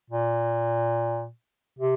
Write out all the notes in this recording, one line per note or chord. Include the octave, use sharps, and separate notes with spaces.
A#2
C3